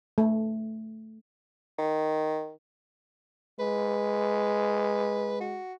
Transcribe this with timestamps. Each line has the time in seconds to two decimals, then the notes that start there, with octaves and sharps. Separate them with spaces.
0.18 A3
1.78 D#3
3.59 G#3 B4
5.41 F#4